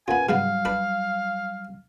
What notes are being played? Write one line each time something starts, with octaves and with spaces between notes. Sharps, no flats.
B3 C#4 F4 A#4 B4 G#5
G#2 C#3 F#3 G3 B3 F5
D4 B4